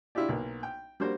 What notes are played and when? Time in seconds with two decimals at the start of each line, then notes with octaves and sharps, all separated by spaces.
0.15 D4 E4 F4 G4 D5
0.29 B1 A#3
0.63 G5
1.00 G3 A#3 D4 F#4 C5